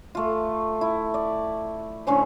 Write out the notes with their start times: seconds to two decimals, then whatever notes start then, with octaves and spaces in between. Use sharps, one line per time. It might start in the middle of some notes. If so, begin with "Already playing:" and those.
0.15 A3 F4
0.81 E4
1.14 D5
2.07 A2 D3 C#4 C5